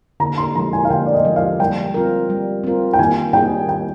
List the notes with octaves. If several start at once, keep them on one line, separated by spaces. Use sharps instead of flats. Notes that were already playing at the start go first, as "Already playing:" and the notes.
D3 A#5
C6
F3 G#3 A#5
G#5
F5
D3 G5
D5
D#5
F3 G#3
F5
G3 G5
C4 F4 A#4
G3
C4 F4 A#4
G5
D#3 G#5
G3 D4 G#4 G5
D#3 G5